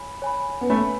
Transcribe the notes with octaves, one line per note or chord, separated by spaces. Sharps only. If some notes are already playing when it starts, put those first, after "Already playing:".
Already playing: C#5 G#5 B5
C#5 G#5 B5
B3
A3 C#5 G#5 B5